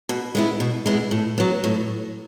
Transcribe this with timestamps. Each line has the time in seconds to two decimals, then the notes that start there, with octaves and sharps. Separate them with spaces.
0.09 B2
0.35 G#3 B3 E4
0.60 B2
0.86 G#3 B3 E4
1.11 A2
1.38 F#3 B3
1.64 A2